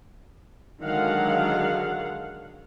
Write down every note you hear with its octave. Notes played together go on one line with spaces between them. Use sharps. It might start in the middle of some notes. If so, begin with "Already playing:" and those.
D3 D#3 F#3 G#3 F5 F#5